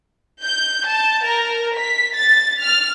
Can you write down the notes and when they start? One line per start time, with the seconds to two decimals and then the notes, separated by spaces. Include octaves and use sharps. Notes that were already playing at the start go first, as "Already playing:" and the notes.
0.42 G6
0.87 A5
1.25 A#4
1.78 B6
2.15 A6
2.62 F6